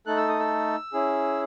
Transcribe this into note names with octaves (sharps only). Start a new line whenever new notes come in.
A3 D#4 A4 F#6
E6
D#6
E6
C#4 E4 G#4